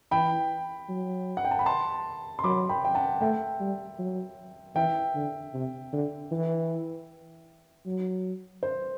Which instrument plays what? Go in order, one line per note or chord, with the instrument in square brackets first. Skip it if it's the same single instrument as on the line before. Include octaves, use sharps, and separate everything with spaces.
[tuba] E3 [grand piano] G5 B5
[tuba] F#3
[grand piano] F#5
G5
A5
B5
A5 C6
C6
[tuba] F#3 [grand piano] B5 D6
[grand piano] G5 B5
G5
F#5 A5
[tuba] A3 [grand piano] E5 G5
[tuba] G3
F#3
[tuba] E3 [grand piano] E5 G5
[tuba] D3
C3
D3
E3
F#3
[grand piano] C5